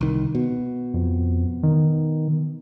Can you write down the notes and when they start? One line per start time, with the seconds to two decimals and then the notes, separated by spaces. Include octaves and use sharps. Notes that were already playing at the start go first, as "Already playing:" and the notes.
0.01 C2 D#3
0.35 B2
0.94 F2
1.63 D#3